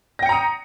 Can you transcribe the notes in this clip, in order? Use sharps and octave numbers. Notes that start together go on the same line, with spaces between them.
G5 A#5 D#6 A#6 C#7